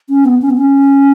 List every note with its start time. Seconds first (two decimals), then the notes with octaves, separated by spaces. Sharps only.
0.09 C#4
0.25 B3
0.42 C#4
0.50 B3
0.57 C#4